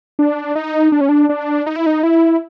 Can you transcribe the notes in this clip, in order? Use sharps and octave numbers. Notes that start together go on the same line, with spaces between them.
D4
D#4
D4
C#4
D4
D4
D#4
E4
D#4
E4